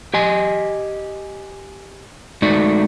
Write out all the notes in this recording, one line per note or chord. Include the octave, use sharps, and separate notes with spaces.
G4 D#5 G#5
G#3 A3 D#4 F#4 D5